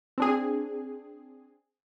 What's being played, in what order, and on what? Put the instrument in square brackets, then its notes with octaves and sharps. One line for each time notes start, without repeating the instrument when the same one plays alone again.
[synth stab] C4 D4 G#4